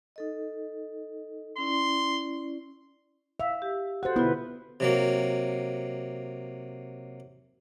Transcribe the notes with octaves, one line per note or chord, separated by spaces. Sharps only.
D#4 A4 D#5
C#4 E4 D5 C6
E5 F5
G4
F#4 A4 C5 F#5
B2 D3 B3 E4 F4 B4
C3 F#3 A#3